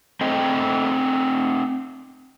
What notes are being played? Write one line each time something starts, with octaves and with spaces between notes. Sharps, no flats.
A3 C4 D#5 G5